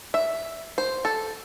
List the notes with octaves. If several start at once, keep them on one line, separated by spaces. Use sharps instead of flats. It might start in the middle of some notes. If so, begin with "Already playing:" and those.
E5
C5
A4